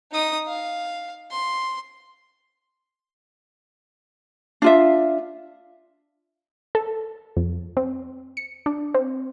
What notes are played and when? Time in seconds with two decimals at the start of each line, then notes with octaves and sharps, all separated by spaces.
0.12 D#4 D#6
0.48 F5
1.31 C6
4.62 D4 F4 E5
6.75 A4
7.37 F2
7.77 C4
8.37 C#7
8.66 D4
8.95 C4